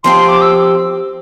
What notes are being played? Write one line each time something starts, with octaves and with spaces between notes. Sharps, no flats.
F3 C4 G4 C6
C6
D6
E6